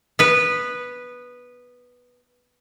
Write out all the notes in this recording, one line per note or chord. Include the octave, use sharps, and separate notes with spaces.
B3 B4